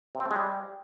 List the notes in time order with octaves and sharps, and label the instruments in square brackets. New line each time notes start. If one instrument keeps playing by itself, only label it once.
[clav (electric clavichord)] C3
C4
A3
G#3
G3